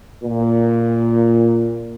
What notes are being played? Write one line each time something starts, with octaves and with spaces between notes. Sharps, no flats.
A#2